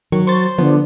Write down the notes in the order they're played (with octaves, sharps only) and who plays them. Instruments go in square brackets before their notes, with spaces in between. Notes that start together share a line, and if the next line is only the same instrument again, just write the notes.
[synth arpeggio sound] D#3 C#6 [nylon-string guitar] F#3
[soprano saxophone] C5 [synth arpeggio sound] C#6 A6
[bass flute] D3 [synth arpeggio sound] F3 [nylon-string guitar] B3